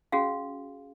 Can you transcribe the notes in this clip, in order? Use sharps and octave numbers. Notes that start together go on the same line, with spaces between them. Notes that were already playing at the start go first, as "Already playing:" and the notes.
C#4 F#4 G#4 F5